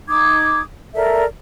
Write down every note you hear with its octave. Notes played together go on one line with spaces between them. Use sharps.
D#4 D6 D#6 G#6
A4 A#4 D5 E5